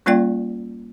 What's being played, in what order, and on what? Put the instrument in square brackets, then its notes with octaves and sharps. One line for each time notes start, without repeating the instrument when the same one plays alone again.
[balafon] G3 A#3 C#4 F4 D5 G5